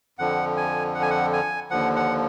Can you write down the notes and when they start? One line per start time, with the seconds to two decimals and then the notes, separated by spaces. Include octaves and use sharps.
0.19 F2 D3 F3 F#5
0.57 G#5
0.95 F#5
1.02 G#5
1.10 F#5
1.33 G#5
1.71 D#2 D3 F3 F#5
1.96 F#5